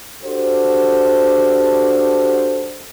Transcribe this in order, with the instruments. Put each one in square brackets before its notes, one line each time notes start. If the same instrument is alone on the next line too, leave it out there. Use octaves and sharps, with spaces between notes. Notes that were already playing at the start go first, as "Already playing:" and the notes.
[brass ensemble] D4 F#4 G4 A4 C5